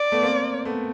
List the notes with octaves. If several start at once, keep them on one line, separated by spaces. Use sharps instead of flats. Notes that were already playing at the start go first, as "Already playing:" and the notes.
Already playing: D5
A3 B3
A#3 C4
A3 B3